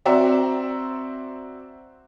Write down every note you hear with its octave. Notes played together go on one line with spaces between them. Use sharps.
C4 F#4 C5 D5 E5 A#5